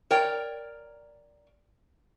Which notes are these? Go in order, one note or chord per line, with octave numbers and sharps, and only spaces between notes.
A#4 C#5 D5 G5